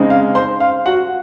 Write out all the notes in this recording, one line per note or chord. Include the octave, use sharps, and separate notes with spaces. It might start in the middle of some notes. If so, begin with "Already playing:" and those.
Already playing: C#3 G#3 C4 D#4
F5
C5 C6
F5
F#4 F#5